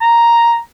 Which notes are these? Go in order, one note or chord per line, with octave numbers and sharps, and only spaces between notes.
A#5